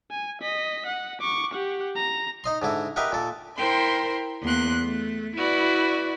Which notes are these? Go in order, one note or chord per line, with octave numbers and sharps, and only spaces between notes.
G#5
D#5 B6
F#5
C#6 D6
G4 F#5
A#5
D#4 D#5 C6
G#2 D3 E4
G4 A#4 B4 D#5 E5 F#5
A#2 A4
E4 A#4 C5 G5 C6
E2 A#3 C6 F#6
A3
E4 F#4 B4 D5